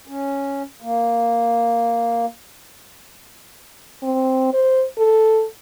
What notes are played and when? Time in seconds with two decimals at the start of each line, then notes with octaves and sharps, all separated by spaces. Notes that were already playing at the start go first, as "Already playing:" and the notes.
0.08 C#4
0.82 A#3
4.03 C4
4.54 C5
4.98 A4